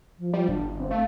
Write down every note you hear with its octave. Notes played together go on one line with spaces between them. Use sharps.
F3
F3 G3
G1 D4
C4
A3 F5